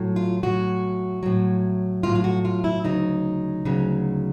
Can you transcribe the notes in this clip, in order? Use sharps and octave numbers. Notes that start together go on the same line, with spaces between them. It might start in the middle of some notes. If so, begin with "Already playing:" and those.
Already playing: A2 F#3
F4
A2 F#3 F#4
A2 F#3
A2 F#3 F4
F4
F#4
F4
E4
D2 C#3 F#3 D#4
D2 C#3 F#3